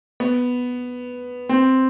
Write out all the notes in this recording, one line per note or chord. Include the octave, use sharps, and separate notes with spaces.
B3
C4